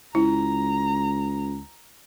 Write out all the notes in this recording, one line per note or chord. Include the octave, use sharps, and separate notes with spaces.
C#2 E4 A#5